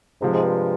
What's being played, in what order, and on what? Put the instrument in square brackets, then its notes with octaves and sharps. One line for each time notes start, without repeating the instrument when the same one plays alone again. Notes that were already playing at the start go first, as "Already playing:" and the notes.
[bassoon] G#2 [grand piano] C3 F3 G#3
[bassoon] G#2
G2